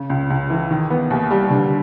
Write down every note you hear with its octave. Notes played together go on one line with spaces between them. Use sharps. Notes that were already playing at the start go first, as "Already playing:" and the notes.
Already playing: C#3
C#2
C#2
E3
D#3
B3
D#2
G3
D3